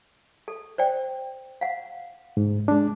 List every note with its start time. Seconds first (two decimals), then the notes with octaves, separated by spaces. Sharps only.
0.48 A4
0.78 C5 D5 G5
1.61 F5 F#5
2.37 G#2
2.68 G#3 D4